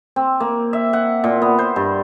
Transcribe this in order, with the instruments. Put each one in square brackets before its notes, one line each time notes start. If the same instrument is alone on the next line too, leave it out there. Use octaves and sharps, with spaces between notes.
[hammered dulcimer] C4
A#3
E5
F#5
A#2
B3
C5
G2